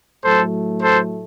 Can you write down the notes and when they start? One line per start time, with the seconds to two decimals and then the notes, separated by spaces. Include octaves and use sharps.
0.24 A2 F#3 A3 A4 C5
0.82 A4 C5